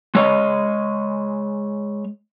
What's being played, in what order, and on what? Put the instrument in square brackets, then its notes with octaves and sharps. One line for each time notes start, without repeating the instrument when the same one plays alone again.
[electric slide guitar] G#3 C#5 D#5